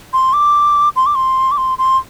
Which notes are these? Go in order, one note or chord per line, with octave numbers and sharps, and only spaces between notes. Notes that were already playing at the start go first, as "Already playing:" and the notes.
C6
D6
C6
D6
C6
D6
C6
C6